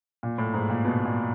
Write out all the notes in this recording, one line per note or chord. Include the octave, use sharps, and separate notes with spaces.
A#2
A2
G#2
A#2
B2
A#2